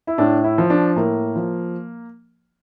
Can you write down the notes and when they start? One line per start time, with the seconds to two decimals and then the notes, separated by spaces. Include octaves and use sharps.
0.07 E4
0.18 A2 D4
0.44 E4
0.58 F3
0.70 D4
0.96 A2 A#3
1.36 F3